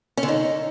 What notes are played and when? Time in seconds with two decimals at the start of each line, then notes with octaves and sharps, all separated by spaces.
0.17 C#4
0.23 D3
0.28 D#4